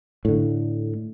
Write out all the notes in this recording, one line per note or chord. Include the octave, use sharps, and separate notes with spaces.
A2 D3